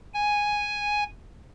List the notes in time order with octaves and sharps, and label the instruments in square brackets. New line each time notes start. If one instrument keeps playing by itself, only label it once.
[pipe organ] G#5